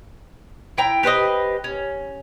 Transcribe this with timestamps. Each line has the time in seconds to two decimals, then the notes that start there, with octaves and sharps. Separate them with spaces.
0.78 E4 G5 A#5
1.03 G4 B4 C5 D#5
1.64 C#4